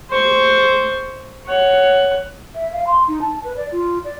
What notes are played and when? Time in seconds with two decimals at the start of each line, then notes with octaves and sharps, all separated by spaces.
0.10 C5 C#6
1.46 C#5 F#5
2.55 E5
2.72 F5
2.87 C6
3.08 D#4
3.21 A5
3.44 B4
3.57 D5
3.72 F4
4.04 D5